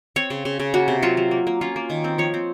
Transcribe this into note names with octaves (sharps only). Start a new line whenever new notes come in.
C4 C#5
C#3
C#3
C#3
A#3 F#4
C3
F#3 F4
F#3
A#3
A#3
C#4 F4
A#3
D#3
C4
F3 C#5
C4